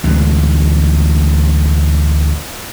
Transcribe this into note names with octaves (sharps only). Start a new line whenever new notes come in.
A1 D2 B2 G#3